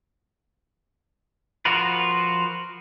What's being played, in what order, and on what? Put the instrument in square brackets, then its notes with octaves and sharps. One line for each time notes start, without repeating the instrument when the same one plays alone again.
[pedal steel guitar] F3 F4 F#4 A#4 B4